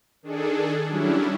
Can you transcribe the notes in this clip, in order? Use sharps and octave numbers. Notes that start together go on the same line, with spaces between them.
D#3 D4 G#4 A4
F#3 G3 C#4 D4 E4